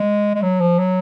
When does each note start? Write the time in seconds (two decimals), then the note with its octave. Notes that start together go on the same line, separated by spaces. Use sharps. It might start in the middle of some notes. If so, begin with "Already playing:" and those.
Already playing: G#3
0.34 G#3
0.42 F#3
0.60 F3
0.78 F#3